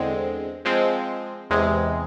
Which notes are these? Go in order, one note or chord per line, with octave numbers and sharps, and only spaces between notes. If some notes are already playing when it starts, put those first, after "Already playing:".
Already playing: E2 D3 G#3 C4
F3 G#3 C4
E2 C3 G#3